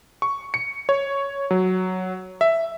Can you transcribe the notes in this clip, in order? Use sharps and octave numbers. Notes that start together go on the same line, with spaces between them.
C#6
C#7
C#5
F#3
E5